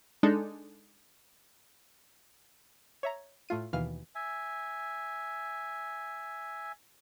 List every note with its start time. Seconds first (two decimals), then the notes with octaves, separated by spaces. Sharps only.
0.23 G#3 D4 D#4 A4
3.03 C#5 E5 A#5
3.49 A2 A3 F4 D#7
3.73 D#2 B2 D#3 E3 F5 F6
4.15 E5 G#5